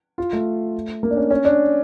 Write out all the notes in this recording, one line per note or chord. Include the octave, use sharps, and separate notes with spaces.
F4
A3
A#3
D4
C#4
C#4
D4